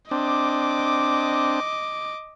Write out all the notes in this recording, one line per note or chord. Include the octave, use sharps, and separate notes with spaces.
C4 D4 D#5 D6